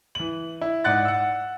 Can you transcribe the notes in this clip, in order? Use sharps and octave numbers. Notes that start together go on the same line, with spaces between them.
E3 F#7
E4
G#2 D5 F#5 F#6 A6
F#5 E6